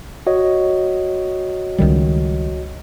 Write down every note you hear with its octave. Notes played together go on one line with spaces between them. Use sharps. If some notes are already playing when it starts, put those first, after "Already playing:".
F#4 C#5 D#5
C#2 D#3 G3